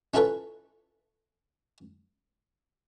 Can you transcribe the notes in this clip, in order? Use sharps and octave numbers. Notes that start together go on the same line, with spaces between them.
C#4 E4 F4 A4 B4 C#5